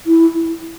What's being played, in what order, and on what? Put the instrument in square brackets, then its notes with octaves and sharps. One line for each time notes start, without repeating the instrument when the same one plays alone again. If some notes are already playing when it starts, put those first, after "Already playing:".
[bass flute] E4